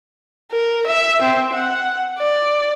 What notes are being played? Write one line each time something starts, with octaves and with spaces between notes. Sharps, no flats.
A#4
E5
C4
F#5
D5